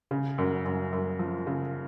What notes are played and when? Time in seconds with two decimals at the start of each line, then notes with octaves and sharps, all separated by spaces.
0.11 C#3
0.38 F#2
0.65 F#2
0.93 F#2
1.19 F3
1.47 C#3